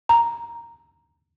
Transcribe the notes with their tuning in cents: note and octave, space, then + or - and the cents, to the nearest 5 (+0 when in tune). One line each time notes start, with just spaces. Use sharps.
A#5 +0